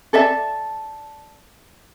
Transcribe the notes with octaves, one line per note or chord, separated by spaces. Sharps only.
A4 D5 E5 A5